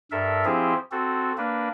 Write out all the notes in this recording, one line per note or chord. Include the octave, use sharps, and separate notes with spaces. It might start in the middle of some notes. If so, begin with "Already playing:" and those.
G2 A4 A#4 E5
F3 C4 E4 G4 G#4 C5
C4 F#4 A4
A#3 D4 B4